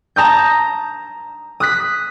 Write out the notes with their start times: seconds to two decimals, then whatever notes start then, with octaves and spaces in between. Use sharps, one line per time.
0.16 A5 A#5 D#6 G6
1.60 D#6 F#6 B6